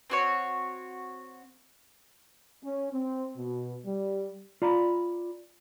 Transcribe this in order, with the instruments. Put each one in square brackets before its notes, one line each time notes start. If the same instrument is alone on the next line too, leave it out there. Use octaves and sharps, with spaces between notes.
[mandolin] C4 F#4 C#5
[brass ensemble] C#4
C4
B2
G3
[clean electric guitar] F4 D5 A#5 B5